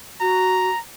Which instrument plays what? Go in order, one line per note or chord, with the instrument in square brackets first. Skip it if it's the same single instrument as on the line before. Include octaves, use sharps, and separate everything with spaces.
[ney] F#4 [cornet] A#5